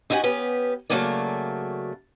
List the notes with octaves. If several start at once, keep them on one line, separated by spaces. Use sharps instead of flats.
D#4 E4 F#4 G4 F#5 G#5
B3 C#4 G4 B4
C#3 E3 F#3 A3 A#3 D5